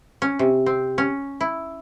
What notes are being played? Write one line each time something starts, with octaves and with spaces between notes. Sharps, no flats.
C#4
C3
C4
C#4
E4